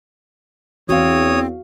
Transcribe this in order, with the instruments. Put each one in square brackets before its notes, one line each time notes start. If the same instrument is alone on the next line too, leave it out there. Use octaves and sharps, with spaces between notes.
[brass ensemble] E2 [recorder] C4 [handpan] F#4 F5 [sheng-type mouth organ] C#5 D#6